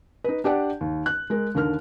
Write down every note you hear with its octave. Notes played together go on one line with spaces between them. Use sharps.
D#4 B4
D4 G4 D5 F#5
D#2
F#6
G#3 A#4
D#2 D3 A#4 F6